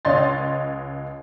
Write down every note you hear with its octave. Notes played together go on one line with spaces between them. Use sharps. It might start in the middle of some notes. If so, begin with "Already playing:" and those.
C#2 C#5 D#5 C6 A6